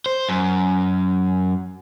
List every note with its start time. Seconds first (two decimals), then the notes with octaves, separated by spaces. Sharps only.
0.06 C5
0.29 F#2